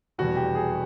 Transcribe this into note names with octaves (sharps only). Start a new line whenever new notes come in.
F1 E2 B2 G3 F#4
G4
G#4